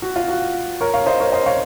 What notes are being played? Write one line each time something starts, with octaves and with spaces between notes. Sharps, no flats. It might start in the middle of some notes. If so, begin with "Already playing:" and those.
F#4
F4
F#4
A#4 C#5
C#5 F5
C5 D#5
A#4 C#5
C5 D#5
C#5 F5